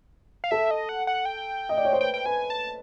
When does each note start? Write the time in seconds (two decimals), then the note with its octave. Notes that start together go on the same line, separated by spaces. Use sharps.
0.44 F5
0.51 A4 E5
0.71 D#5
0.89 F#5
1.07 F#5
1.25 G5
1.69 D#5
1.77 D5
1.85 C#5
1.93 C5
2.00 B4 G5
2.14 G5
2.25 B4 G#5
2.50 A5